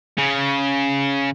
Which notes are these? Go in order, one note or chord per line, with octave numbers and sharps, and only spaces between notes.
C#3